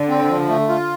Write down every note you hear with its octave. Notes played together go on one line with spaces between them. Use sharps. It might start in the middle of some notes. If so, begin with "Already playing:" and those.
Already playing: D3
C4
F3
A3
F4